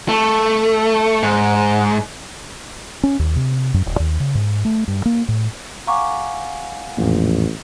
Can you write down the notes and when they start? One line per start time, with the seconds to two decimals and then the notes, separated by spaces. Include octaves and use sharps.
0.09 A3
1.23 G#2
3.03 C#4
3.19 D#2
3.36 C3
3.74 F#2
3.86 D#1
4.00 D#2
4.20 C#3
4.35 G#2
4.65 A3
4.88 G2
5.06 A#3
5.28 A2
5.87 F5 F#5 G#5 A#5 C#6 D6
6.97 A1 F2 A#2